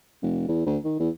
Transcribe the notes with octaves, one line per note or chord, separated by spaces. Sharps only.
F1
E2
D2
D#3
E2